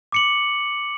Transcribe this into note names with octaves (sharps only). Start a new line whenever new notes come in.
D6 C#7 F#7